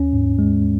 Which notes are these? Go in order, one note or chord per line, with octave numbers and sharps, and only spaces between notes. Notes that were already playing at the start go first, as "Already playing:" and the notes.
Already playing: D#2 C#4
G#2
G#3